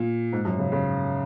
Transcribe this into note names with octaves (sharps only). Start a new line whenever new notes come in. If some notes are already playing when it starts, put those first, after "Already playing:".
Already playing: A#2
G#2
F#2
C#3
C#3